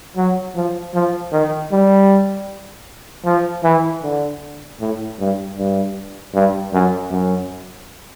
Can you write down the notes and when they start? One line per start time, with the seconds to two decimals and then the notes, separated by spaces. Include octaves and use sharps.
0.17 F#3
0.55 F3
0.94 F3
1.32 D#3
1.72 G3
3.25 F3
3.64 E3
4.03 D3
4.80 A2
5.19 G2
5.58 G2
6.34 G2
6.73 F#2
7.11 F#2